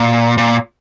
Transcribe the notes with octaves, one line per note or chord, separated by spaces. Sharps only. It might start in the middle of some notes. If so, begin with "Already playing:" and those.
Already playing: A#2
A#2